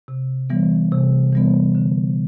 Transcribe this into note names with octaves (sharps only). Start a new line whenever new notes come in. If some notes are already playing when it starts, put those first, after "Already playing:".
C3
E3 G3 B3
C3
E3 G3 B3
D3